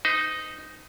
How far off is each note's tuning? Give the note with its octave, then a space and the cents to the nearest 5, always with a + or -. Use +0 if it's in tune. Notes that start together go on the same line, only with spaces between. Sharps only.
D#4 +0 C5 -45